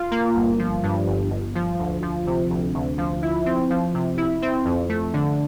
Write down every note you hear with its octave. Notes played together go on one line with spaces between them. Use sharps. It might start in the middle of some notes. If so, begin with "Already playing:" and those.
Already playing: F4
A#3
G1
F3
G2
G1
G1
F3
D2
F3
C3
D2
D2
F3
E4
C4
F3
C3
E4
C4
F2
A3
D3